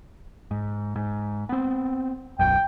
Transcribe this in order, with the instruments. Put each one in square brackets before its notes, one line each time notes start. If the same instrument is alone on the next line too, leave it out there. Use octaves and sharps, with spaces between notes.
[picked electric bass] G#2
G#2
B3 C4
[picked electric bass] D1 B1 F#2 [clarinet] G5